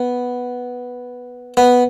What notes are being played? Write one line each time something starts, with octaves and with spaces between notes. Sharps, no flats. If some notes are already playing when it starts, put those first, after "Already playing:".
Already playing: B3
B3